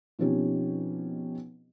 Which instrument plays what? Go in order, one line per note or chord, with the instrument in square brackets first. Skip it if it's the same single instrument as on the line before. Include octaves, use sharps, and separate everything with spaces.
[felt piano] B2 F3 C4 C#4 D#4 G4